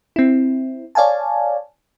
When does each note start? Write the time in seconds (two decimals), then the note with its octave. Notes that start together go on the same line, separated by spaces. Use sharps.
0.16 C4 E4
0.95 C#5 D5 F5 G#5 A5